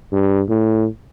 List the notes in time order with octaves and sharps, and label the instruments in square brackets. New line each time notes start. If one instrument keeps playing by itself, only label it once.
[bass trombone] G2
A2